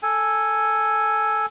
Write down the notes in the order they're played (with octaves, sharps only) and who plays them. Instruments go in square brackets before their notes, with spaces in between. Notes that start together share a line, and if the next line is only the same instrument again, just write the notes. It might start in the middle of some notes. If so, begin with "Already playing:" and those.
[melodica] A4 G#5